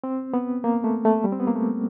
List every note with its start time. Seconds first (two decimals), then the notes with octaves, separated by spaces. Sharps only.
0.04 C4
0.34 B3
0.64 A#3
0.84 A3
1.05 A3
1.24 G3
1.32 C4
1.40 B3
1.47 A#3
1.55 A3